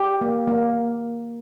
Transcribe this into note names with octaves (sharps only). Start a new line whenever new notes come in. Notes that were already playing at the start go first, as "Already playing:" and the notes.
Already playing: G4
A#3
A#3